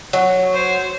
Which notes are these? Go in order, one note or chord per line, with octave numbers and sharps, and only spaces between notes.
F#3
C5 C#5